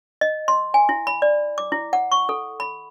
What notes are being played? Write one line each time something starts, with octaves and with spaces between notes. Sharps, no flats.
D#5
C6
G#5
E4
B5
D5
D6
E4
F#5
C#6
A4
B5